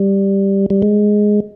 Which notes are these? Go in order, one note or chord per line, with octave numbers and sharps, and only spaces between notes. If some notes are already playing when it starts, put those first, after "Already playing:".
Already playing: G3
G3
G#3